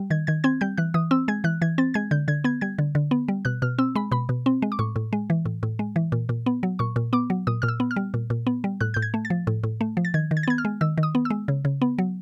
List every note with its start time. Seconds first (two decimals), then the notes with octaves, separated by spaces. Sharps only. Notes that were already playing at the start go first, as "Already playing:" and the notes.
Already playing: G3
0.10 D#3 G#6
0.27 D#3 G#6
0.44 C4 G#6
0.61 G3 G6
0.77 E3 F#6
0.94 E3 D#6
1.11 C4 E6
1.28 G#3 G#6
1.44 E3 F#6
1.62 E3 G#6
1.78 C4 A6
1.94 G#3 G#6
2.11 D3 G6
2.28 D3 G#6
2.44 B3 G#6
2.61 G3 G#6
2.78 D3
2.95 D3
3.11 B3
3.28 G3
3.45 B2 F#6
3.62 B2 F6
3.78 C4 E6
3.95 G#3 B5
4.12 B2 B5
4.29 B2
4.46 C4
4.62 G#3
4.72 D6
4.79 A2 C#6
4.96 A2
5.13 G#3
5.30 E3
5.46 A2
5.63 A2
5.79 G#3
5.96 E3
6.12 A#2
6.29 A#2
6.46 B3
6.63 F#3
6.79 A#2 C#6
6.96 A#2
7.13 B3 D6
7.30 F#3
7.47 A#2 D#6
7.62 A#2 F6
7.68 E6
7.80 B3
7.91 F6
7.96 G3
8.14 A#2
8.30 A#2
8.47 B3
8.64 G3
8.81 A2 F#6
8.94 A2 G6
9.02 G#6
9.14 A3
9.25 A6
9.30 F3
9.47 A2
9.64 A2
9.81 A3
9.97 F3
10.05 A6
10.14 D#3 G#6
10.31 D#3
10.37 G#6
10.43 A6
10.48 B3 G#6
10.58 F6
10.65 G#3
10.81 D#3 E6
10.98 D#3
11.03 D#6
11.15 B3
11.25 E6
11.30 G#3
11.48 C#3
11.65 C#3
11.82 B3
11.98 F#3